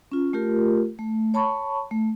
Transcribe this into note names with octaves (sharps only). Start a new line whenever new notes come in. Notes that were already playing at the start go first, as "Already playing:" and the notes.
C#4 F4
A3 F4 G4 A#4
A3
C#5 A5 B5 C#6
A3